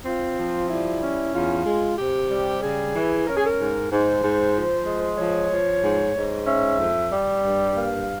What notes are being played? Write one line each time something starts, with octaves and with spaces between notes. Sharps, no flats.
C4 F4
F3
G3 E4
C#4
E2 F4
G#3
C3 G4
G3
C#3 G#4
E3
C#4 A#4
G#4
A#4
G#2
G#2 C5
G#2
F3
G#3
F3 C#5
F3
G#2
G#2
C#4 E5
F2
G3
G2
A#3 F5